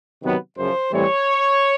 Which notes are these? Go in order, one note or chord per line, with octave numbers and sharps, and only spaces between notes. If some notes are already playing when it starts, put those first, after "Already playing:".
C3 D#3 F#3 B3
F#2 C#3 F3 C5
A2 E3 G3 C4 C#5